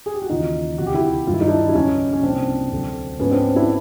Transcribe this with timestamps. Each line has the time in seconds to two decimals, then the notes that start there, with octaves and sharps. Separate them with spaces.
0.06 G#4
0.14 G4
0.22 F#4
0.29 D#2 C#3 E3 D#4 F4
0.78 D2 C3 F3 F#4
0.87 G4
0.94 E4 F#4
1.27 G2 D#3 F#3 F4
1.34 E4
1.41 D#4
1.48 D4 E4
1.69 E4
1.74 C#2 C#3 F#3 C#4 D#4
2.13 C#4
2.23 C2 A#2 F3 C4 D4
2.71 D2 D3 F#3
3.19 G#2 F3 B3 C#4
3.31 C4 D4
3.56 D4 E4